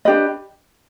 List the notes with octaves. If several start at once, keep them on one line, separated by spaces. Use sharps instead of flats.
D4 G4 B4 D#5